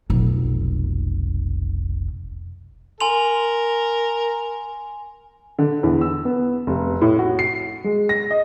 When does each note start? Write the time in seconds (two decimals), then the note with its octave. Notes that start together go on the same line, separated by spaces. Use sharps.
0.10 F1 B1
3.00 A#4 G#5 C6 F7
5.59 D3
5.83 E2
6.01 E6
6.25 B3
6.67 F1
7.01 A2
7.19 F#4
7.39 C7
7.84 G#3
8.09 A#6
8.30 D#5